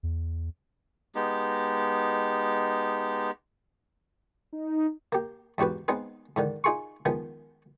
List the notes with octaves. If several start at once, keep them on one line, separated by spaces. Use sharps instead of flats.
E2
G#3 B3 D#4 G4
D#4
A#3 G4
E2 G#2 F#4 G4 B4
G#3 B3 C4 D#4 B4
G#2 D3 D#3
D#4 F4 G#4 C6 C#6
D#3 F3 G#3 B3